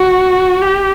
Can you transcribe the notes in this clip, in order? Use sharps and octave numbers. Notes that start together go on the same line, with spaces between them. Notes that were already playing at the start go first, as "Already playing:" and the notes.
Already playing: F#4
G4